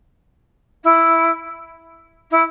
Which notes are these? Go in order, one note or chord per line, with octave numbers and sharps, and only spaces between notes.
E4
E4